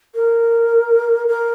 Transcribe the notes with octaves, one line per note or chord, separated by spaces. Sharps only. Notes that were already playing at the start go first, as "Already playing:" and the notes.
A#4
A#4